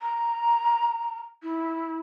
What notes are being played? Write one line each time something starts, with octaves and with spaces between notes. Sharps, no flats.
A#5
E4